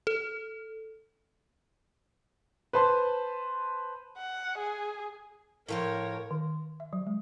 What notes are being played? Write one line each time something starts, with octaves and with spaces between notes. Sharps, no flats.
A4
B4 C5 A5 C6
F#5
G#4
A2 F3 F4 A#4 C#5
D#3
E5
F#3
G#3